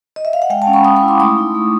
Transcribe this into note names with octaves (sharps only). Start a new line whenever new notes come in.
D#5
E5
F5
F#5
G#3 F5 G5
G5 A5
C#4
B5 C#6
G#3 C#6 D#6
B5 C#6
E4
C6 D6
A3 C#6 D#6
D#4
A3